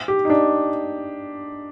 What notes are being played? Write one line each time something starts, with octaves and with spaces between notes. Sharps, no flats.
G4
D#4
D4